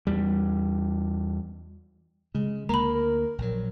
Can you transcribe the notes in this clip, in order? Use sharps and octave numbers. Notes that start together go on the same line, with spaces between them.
E2 G3
C#3 G#3
D2 A#3 A#4 A#5 B5
A#4
A#1 F#3